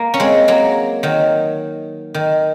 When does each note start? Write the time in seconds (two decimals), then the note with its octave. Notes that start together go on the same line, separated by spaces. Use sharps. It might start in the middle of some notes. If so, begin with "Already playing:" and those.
Already playing: A#3
0.14 C#4
0.20 G#3 C4
0.48 F#3 A#3
1.03 D#3 F#3
2.14 D#3